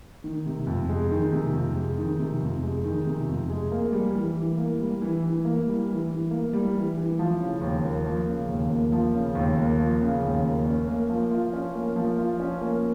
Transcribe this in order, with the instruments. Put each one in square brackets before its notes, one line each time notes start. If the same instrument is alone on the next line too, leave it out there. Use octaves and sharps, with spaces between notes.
[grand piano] D#3
C3
F2
G#3
D#3
C3
F2
G#3
D#3
C3
F2
G#3
D#3
C3
F2
G#3
A#3
G3
E3
E3
A#3
G3
E3
E3
A#3
G3
E3
E3
A#3
G3
E3
E3
F3
C#3
D#2
A#3
F3
C#3
D#2
A#3
F3
C#3
D#2
A#3
F3
C#3
D#2
A#3
C#4
A#3
F3
F4
C#4
A#3
F3
F4
C#4
A#3